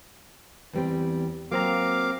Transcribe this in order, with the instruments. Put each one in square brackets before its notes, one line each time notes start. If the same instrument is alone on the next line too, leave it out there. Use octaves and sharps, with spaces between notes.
[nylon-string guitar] E2 G3 C4
[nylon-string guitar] F#3 [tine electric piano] A#3 C4 A#5 [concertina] F5 D6